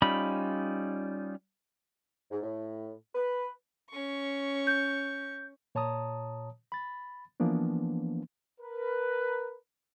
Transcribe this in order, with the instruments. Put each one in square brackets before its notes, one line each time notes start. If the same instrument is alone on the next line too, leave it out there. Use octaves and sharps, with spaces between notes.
[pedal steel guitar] G3 C#4 D#4 F4 B5
[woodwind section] G#2
A2
B4
[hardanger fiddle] C#4 C#6
[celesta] G6
[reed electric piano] A#2 C#5 A5 A#5 D#6
B5 A6
E3 F3 A#3 B3 D4
[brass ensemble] A#4 B4